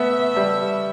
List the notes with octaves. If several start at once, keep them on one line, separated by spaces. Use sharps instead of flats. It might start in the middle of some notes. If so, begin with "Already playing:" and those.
Already playing: A3 B3 E5
G3